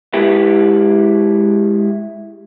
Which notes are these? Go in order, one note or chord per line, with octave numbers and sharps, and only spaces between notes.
G#3 E4 G4 B4